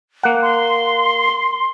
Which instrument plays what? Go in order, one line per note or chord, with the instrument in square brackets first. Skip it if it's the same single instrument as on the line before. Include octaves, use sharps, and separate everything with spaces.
[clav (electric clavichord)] A#3 F#5
[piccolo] C6